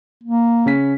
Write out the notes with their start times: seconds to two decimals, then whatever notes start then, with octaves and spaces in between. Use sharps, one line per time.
0.23 A#3
0.66 C#3 C#4 B6